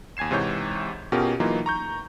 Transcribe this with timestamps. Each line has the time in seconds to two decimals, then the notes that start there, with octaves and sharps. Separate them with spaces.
0.17 D#2 G#5 G#6 C7 E7
0.31 G#2 C3 E3 C#5 G6
1.12 B2 C#4 F4 G4 G#4 A#4
1.40 E3 F#3 A#3 D#4 F4
1.66 A#5 C#6 G6